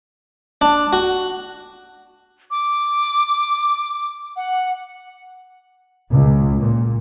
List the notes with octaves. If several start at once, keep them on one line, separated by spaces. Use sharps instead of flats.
D4
F#4
D6
F#5
C#2
A#2